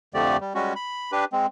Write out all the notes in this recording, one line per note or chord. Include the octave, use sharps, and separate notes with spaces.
F2 D3 F3 A3 G4 D5
G3
G3 G#3 C#4 F#4
B5
D4 G4 B4
G#3 C4